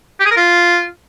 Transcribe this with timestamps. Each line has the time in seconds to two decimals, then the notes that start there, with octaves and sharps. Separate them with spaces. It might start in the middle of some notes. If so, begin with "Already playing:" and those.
0.20 G4
0.25 G#4
0.31 A#4
0.37 F4